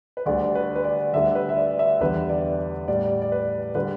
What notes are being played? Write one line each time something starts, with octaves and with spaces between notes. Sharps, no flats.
B4
D2 D3 G3 D5
B4
B4
D5
D2 D3 G3 E5
B4
E5
D5
E5
E2 D3 G3 B4
D5
A2 G3 D5
D5
B4
D3 G3 B4